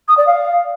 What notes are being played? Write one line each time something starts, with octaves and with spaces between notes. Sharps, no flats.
D#6
D5
F5